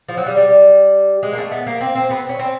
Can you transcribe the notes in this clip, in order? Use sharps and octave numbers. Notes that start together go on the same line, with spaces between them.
F3
F#3
G3
G3
G#3
A#3
A3
B3
A#3
C4
C4
B3
C#4
C4